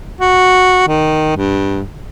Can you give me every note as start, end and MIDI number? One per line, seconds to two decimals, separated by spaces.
0.21 0.86 66
0.88 1.34 51
1.37 1.81 43